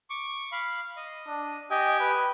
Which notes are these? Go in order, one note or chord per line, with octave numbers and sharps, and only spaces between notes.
C#6 D6
F5 B5
D#5
D4
G4 D#5 G5 G#5
B4